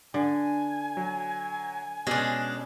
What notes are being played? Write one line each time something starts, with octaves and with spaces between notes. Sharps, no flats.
D3 G#5
F#3
B2 G#3 C#4 D4